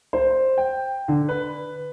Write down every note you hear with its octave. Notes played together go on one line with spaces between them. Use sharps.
C5
G5
D3
B4